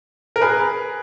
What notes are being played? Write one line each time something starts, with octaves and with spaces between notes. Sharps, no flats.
A#4
G#4 B4